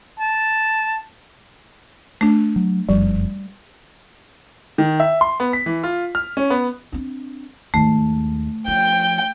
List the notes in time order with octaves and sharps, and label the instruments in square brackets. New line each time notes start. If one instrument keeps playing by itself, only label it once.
[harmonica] A5
[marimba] A3 D4
[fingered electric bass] F#3
[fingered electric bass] F1 F#2 F3 [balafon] G3
[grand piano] D#3
E5
C6
B3
B6
E3
F4
F6
C#4
B3
[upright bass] C4 D4
[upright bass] D#2 G#2 [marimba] A3
[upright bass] F3 [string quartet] G5 G6